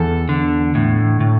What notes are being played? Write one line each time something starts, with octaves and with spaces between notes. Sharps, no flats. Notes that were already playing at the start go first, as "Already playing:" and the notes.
Already playing: E2 A4
D3
A2
A2